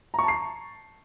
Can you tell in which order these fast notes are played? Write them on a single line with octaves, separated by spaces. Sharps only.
A#5 C#6 A5 C7